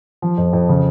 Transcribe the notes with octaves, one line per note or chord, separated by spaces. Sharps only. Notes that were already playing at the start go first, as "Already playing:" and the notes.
F3
F2
F2
C#3